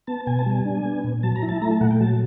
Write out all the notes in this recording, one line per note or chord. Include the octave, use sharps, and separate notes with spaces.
B3 A5
B2 G#5
A5
G3 G#5
D4
B3
A#2
F#3 A5
A#5
E4
A5
A3 A#5
A5
A#2 F#5
G5
F#3 A5